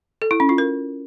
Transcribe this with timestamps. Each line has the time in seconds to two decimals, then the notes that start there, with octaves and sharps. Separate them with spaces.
0.22 A4
0.31 E4
0.40 C#4
0.49 F4
0.58 A#4